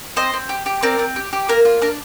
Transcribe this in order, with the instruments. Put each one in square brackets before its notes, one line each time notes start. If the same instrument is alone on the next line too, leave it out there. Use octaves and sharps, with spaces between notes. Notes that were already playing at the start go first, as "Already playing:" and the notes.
[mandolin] C4 C5 D#5
C4
G4
G4
C4 A#4 D5
C4
G4
G4
A#3 A#4
F4
D4 A#4